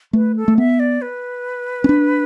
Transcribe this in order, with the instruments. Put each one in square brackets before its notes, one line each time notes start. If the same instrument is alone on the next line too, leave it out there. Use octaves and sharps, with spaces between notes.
[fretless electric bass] A3 [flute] B4
[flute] A4
[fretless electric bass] A3
[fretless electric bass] B3 [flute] E5
[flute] D5
B4
[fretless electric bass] C#4
D4